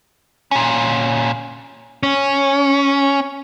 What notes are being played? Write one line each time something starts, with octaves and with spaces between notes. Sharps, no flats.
A#2 C#4
C#4